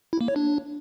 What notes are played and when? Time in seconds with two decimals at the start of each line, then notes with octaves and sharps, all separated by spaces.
0.13 E4
0.21 A#3
0.28 C#5
0.36 D4